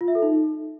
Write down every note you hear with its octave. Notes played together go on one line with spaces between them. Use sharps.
F4
E5
A4
D#4